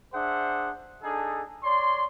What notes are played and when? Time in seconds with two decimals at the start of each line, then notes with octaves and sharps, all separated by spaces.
0.13 D4 G#4 C5 E5 F#5
1.03 D4 D#4 G#4 A4
1.64 C#5 D5 C6